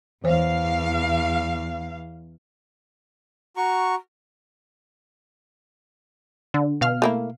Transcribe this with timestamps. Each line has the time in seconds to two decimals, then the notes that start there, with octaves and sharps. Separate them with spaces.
0.24 E2 E3 C5 F5
3.57 F#4 A#5 C#6
6.54 D3
6.81 B2 F5 F6
7.02 A3 A#3 E4